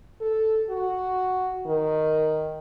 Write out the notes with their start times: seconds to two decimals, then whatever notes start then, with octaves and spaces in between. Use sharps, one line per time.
0.21 A4
0.70 F#4
1.67 D#3